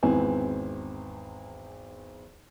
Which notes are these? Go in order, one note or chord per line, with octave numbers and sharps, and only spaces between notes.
G#1 E2 E3 B3 C4 G#5